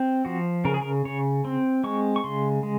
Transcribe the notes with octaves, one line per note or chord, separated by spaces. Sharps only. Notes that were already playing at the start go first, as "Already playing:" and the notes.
Already playing: C4
F3 F#4
C#3 A#4
G#4
A#4
C#3 C#5
C4
G#3 C#6
C#6
C#3 C6
G#3